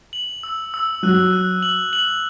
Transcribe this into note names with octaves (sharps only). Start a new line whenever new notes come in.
F#7
E6
E6
F#3 F#6
F#6
F#7
F#7